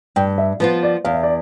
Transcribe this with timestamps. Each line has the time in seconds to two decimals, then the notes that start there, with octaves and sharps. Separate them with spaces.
0.16 G2 G5
0.38 E5
0.60 F3 B3 F4 B4
0.83 D5
1.05 E2 F5
1.14 E5
1.23 D5